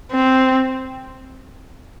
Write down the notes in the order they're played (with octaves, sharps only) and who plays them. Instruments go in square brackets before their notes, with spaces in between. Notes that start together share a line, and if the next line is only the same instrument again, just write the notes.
[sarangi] C4